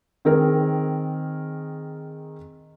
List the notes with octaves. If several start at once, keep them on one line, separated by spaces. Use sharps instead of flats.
D#3 C4 G#4 A#4